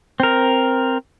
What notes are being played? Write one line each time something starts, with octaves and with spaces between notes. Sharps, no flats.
C4 A#4